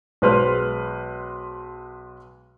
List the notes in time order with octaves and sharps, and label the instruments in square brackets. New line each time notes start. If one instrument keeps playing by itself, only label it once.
[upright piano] B1 G#3 B4 C5 F6